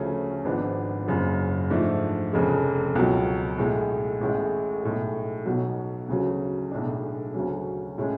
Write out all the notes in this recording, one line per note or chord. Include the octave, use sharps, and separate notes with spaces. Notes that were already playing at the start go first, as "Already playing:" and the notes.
Already playing: D2 C#3 F3 A3 C#4
G#1 G#2 F3 B3 D4
F#1 F#2 C#3
G#2 F3 A3 D4
F1 F2 C#3 G#3
C#2 B2 F#3
B1 A2 G#3
A1 A2 G#3
B1 A2 G#3
B1 B2 F#3
D2 C#3 F#3
B1 A2 G#3 D4
D2 C#3 F#3 C#4
A2 G#3 C#4